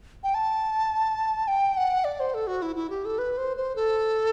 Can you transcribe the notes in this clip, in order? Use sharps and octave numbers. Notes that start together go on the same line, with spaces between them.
G5
A5
G5
F#5
D5
C5
A4
F#4
E4
E4
G4
A4
B4
C5
C5
A4